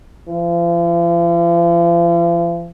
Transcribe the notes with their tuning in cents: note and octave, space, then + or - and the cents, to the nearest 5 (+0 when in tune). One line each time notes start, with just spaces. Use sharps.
F3 -40